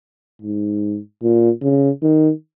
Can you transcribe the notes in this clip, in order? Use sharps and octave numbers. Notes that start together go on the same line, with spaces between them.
G#2
A#2
C#3
D#3